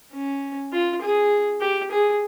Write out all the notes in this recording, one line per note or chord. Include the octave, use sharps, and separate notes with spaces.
C#4
F4
G#4
G4
G#4